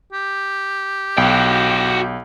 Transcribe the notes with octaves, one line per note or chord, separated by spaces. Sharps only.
G4
B1 F#4 G5